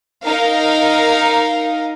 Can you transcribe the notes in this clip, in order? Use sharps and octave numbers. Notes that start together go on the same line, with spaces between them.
D#4 A#4 F5